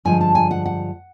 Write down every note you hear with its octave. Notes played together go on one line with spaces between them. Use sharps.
G2 D3 F3 G#3 G#5
A5
G#5
F#5
F#5